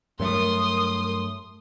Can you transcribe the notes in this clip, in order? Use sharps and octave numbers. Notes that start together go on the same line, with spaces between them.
G2 F#3 A3 A#4 C6 D#6